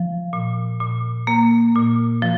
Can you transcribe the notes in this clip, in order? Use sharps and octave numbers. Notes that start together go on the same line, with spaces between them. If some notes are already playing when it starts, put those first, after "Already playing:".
Already playing: F3
A#2
A#2
A#3
A#2
F3